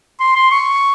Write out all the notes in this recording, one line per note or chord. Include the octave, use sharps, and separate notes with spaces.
C6
C6
C#6